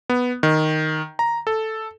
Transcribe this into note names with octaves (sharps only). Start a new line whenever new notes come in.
B3
D#3
A#5
A4